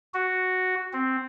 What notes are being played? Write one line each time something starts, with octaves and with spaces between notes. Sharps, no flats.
F#4
C4